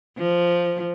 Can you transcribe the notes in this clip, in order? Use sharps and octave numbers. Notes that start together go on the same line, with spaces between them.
F3